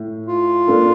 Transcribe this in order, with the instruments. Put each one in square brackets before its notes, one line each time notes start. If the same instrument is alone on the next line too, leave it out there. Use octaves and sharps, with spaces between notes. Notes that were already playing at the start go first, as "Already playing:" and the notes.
Already playing: [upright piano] A2
[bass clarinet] F4
[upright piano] A#3 D4 A4